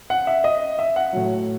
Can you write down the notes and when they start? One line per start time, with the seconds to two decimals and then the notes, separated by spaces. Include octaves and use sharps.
0.10 F#5
0.27 E5
0.44 D#5
0.79 E5
0.96 F#5
1.13 A2 F#3